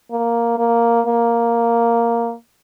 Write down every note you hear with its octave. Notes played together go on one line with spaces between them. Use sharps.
A#3
A#3
A#3